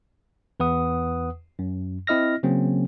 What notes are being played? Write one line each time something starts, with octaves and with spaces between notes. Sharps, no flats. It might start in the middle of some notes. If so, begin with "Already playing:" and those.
E2 B4 F#5 D#6
F#2
C4 E4 D#5 F6 A#6
C#3 F#3 A#3 C4 C#4